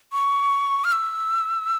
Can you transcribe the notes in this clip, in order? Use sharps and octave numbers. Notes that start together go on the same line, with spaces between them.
C#6
F6
E6